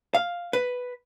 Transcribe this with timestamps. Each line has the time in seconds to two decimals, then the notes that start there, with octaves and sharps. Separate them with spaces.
0.14 F5
0.53 B4